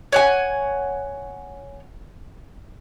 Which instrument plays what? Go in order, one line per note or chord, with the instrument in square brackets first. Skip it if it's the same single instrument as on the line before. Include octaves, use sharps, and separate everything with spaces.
[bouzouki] C#5 F#5 G#5